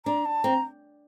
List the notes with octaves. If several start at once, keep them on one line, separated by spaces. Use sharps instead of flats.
D4 A#5
A5
C4 A#5